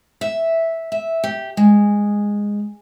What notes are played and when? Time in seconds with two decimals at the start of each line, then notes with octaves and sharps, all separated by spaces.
0.21 E5
0.92 E5
1.24 G4
1.57 G#3